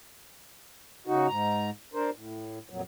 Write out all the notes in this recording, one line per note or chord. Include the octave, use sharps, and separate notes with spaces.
C#3 D#4 F#4
G#2 A#5
D4 A#4 C5
A2
F2 A#2 F#3